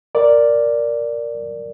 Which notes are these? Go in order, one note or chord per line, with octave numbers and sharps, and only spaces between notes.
A#4 D5